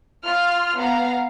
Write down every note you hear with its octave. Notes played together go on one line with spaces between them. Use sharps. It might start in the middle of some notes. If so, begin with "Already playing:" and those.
F4 F6
B3 F5 A#5